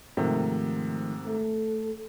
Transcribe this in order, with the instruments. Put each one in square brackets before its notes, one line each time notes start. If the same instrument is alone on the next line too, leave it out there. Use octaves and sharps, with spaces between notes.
[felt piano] G#2 C3 [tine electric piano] D#3 F3 A3
[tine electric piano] A3 [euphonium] A4